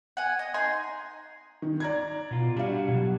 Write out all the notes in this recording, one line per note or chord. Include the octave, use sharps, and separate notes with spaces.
F#5 G#5
D#5
D#4 G#5 C6
D#3
D5 A#5 G#6
B2 F4
G3 D4 F#4 F5
B2 F#3